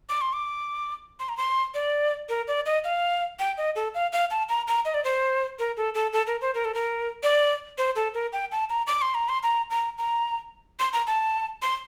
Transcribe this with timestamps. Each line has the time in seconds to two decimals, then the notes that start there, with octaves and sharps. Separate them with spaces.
0.09 D6
0.21 C6
0.33 D6
1.20 C6
1.29 A#5
1.37 C6
1.74 D5
2.29 A#4
2.48 D5
2.66 D#5
2.84 F5
3.39 G5
3.58 D#5
3.76 A4
3.94 F5
4.12 F5
4.31 A5
4.49 A#5
4.68 A#5
4.85 D#5
4.94 D5
5.04 C5
5.59 A#4
5.77 A4
5.94 A4
6.13 A4
6.27 A#4
6.41 C5
6.54 A#4
6.65 A4
6.74 A#4
7.23 D5
7.78 C5
7.96 A4
8.14 A#4
8.33 G5
8.52 A5
8.70 A#5
8.87 D6
9.02 C6
9.14 A#5
9.29 C6
9.43 A#5
9.70 A#5
9.98 A#5
10.80 C6
10.93 A#5
11.07 A5
11.62 C6